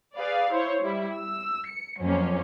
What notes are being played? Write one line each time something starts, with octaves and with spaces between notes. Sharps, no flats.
G#4 B4 D5 F5
E4 C5 C#5
G3 E4
E6
C#7
F2 F#3 A#3 C#4